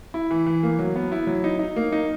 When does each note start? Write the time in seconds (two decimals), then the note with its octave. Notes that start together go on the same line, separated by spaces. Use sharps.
0.14 E4
0.31 E3
0.46 E3
0.63 A#3
0.79 F#3
0.96 B3
1.12 E4
1.27 F#3
1.44 D#4
1.59 D#4
1.76 A#3
1.92 D#4